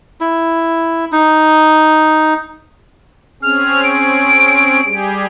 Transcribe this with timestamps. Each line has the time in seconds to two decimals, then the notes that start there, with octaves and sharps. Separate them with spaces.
0.21 E4
1.12 D#4
3.42 C4 C#4 G#4 F6
3.84 D7
4.85 G3 G4 G#4